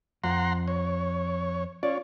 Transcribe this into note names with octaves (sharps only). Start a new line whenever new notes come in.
F2 F#5 A#5 C6
C#5
C#4 F4 C#5 D5